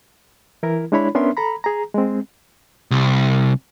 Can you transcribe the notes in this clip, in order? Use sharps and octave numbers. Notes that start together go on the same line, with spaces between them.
E3 E4 A#4
G#3 D4 E4 C#5 B5
B3 C#4 D4 A#4 E5 C6
A4 A#5 B5
G#4 A#5
G#3 C4
C2